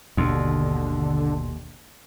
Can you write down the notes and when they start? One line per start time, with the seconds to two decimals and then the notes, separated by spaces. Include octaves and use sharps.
0.17 G#1 D#2 B2 D3 C6